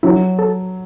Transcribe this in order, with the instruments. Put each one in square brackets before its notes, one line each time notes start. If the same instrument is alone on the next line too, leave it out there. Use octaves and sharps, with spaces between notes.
[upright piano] F#3 [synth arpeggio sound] E4
[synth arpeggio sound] A4